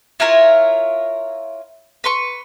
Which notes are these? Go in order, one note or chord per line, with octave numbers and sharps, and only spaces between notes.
E4 F4 A#4 C#5
B4 C6 C#6